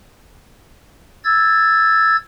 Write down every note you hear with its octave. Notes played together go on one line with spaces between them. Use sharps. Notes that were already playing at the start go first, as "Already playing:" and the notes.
E6 G#6 A6